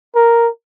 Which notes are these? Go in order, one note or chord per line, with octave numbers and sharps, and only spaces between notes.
A#4